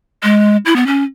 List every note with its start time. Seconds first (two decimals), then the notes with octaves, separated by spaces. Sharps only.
0.23 G#3
0.66 E4
0.76 B3
0.87 C#4